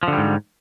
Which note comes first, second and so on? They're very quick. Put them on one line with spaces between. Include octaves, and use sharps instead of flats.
F3 D3 G3 G#2